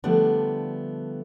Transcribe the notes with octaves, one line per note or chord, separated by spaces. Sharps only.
D3 F3 G3 A3 B3 D4